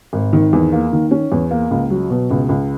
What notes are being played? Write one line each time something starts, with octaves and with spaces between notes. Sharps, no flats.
G#1
D#3
E2
A#3
D#3
C#4
E2
A#3
C#2
F#3
B2
C#2
C#2